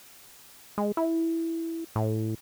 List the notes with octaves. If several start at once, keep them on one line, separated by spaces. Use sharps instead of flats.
G#3
E4
A2